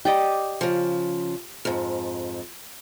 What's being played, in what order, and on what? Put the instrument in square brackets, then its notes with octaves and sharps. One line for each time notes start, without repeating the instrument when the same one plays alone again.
[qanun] G4 D5 D#5
[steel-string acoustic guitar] C#3 F3
F2 G#2